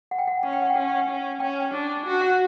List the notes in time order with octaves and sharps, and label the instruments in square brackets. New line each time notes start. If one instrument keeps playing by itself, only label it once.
[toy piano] F#5
G5
F#5
[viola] C#4 [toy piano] F#5
[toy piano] G5
F#5
G5
[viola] C#4 [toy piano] F#5
[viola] C#4
[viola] C#4 [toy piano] G5
[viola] D4
F#4
[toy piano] F#5